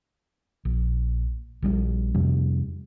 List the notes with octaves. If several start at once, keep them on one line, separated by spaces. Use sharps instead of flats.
A#1
A#1 F3 G3
F2 C3 G3